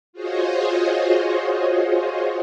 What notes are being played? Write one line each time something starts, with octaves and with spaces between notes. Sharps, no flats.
F4 F#4 G#4 C5 C#5 D#5